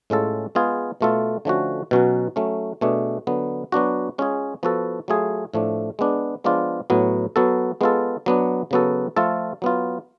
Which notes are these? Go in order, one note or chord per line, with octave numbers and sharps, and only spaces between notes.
A2 G#3 C#4 F4 A4
G#3 B3 F4 G#4
B2 A3 F4 A4
D3 F3 A3 C#4 F#4
B2 F#3 C#4 F#4
F#3 A3 C#4
B2 A3 D4 G#4
D3 F#3 B3
F#3 B3 D4 F#4
G#3 C#4 F4 G#4
F3 B3 F#4 A4
F#3 A3 F4 G#4
A2 F3 A3 D4
G#3 B3 D4
F3 G#3 B3 D4 F4
A2 F#3 B3
F#3 B3 F#4 A4
G#3 B3 F4 A4
F#3 B3 D4
C#3 F#3 B3 F#4 A4
F3 A3 F4 A4
F#3 B3 F4